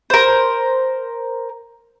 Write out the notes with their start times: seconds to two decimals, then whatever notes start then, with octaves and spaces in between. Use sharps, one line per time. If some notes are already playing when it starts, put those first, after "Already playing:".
0.10 A#4 C5